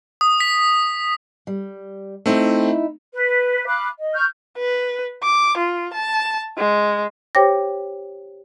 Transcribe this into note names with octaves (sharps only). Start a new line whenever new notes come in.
D#6
B6
G3
A3 C4 D#4 E4
B4
F5 B5 D6 F#6
D#5
C#6 F6 G6
B4
D6
F4
A5
G#3
G4 C5 C#5 G5 D6 A#6